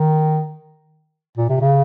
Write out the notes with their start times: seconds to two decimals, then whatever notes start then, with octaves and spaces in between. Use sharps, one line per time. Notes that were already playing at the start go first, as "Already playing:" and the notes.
Already playing: D#3
1.37 A#2
1.49 C3
1.60 C#3